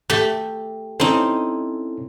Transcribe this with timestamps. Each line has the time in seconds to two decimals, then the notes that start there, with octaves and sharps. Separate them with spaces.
0.10 A3 G4
1.00 C4 C#4 D#4 E4 A4